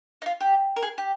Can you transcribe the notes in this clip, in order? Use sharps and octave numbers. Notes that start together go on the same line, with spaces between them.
D#4
F4
G4
A#4
G#4
G4